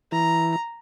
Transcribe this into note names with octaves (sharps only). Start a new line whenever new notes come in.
E3 A#5